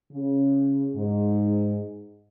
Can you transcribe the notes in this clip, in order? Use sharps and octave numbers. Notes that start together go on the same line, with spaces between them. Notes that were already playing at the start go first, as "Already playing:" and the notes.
C#3
G#2